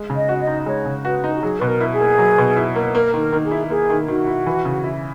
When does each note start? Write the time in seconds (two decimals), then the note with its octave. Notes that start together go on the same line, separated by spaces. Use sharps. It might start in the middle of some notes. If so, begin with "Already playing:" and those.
Already playing: G#3
0.10 C#3
0.16 D#5
0.29 F#4
0.41 D#5
0.47 D#4
0.66 G#3 C#5
0.86 C#3
1.05 F#4 B4
1.24 D#4
1.36 F#4
1.43 F#3 G#4
1.60 B2 B4
1.67 A#4
1.81 E4
1.93 G#4
2.00 A#3
2.18 F#3
2.38 B2
2.57 E4
2.75 A#3
2.94 A#3 A#4
3.14 D#3
3.20 A#4
3.32 D#3
3.45 G#4
3.51 E4
3.70 A#3 G#4
3.90 D#3
4.08 D#3 F#4
4.27 E4
4.46 E3
4.65 C#3
4.84 E4